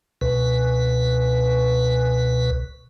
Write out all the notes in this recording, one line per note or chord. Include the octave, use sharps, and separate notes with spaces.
C#2 B2 B4